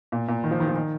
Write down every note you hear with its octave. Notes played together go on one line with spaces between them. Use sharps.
A#2
A#2
D#3
F3
D#3
F3
D#3